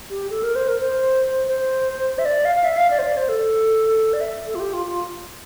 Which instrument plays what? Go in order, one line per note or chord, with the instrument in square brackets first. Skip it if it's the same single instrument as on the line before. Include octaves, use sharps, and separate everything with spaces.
[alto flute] G4
A4
A#4
C5
A#4
C5
C5
E5
D5
F5
F5
E5
F5
D5
C5
D5
C5
A4
D5
E5
A4
F4
G4
F4
F4